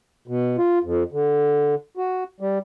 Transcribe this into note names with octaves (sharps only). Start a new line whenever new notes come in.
B2
F4
F2
D3
F#4
G3